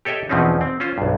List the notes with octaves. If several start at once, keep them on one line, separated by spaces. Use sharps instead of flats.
G4 A4 C#5 D#5 E5 G5
E2 B2 F3 C4 C#4 D#4
C4
C#4 F4 C5
B1 G2